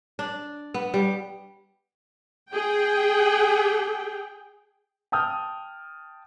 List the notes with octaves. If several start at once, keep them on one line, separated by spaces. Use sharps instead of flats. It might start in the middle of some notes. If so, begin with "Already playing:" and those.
D4
B3
G3
G#4 G5
G5 A5 D#6 F6 G6